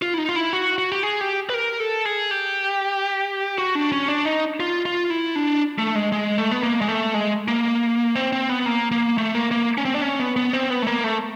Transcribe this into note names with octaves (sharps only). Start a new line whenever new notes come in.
F4
E4
D#4
F4
E4
F#4
F#4
G4
G#4
G4
B4
A#4
A4
G#4
G4
F#4
D4
C#4
D4
D#4
F4
F4
E4
D4
A3
G#3
G#3
A3
B3
A#3
G#3
A3
G#3
A#3
C4
C4
B3
A#3
A#3
A3
A#3
A#3
C#4
C4
D4
C#4
B3
B3
C4
B3
A3
A#3
A3